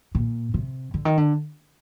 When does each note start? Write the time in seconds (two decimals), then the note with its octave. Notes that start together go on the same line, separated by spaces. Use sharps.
0.15 A#2
0.54 C3
0.94 D3
1.05 D#3
1.17 D3